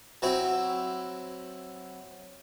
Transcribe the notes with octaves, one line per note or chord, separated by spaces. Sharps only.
F#3 C4 E4